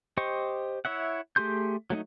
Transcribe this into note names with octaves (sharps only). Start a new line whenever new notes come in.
G4 C5 D#5 C#6
E4 C#5 E5 F#5
A3 G4 G#4 C6 G6
F#3 A3 C4 D#4